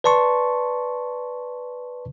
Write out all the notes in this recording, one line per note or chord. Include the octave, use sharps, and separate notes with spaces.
B4 D5 A5 C6 C#6